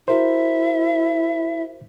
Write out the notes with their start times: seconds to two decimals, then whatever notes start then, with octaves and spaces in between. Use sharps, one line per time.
0.08 E4 F#4 A#4 C5 E5